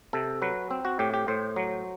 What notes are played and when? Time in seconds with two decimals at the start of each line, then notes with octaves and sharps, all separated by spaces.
0.13 C3 A4
0.42 F#3 B4
0.71 C4
0.85 F#4
0.99 A2 G4
1.14 G4
1.28 A2 C5
1.56 F#3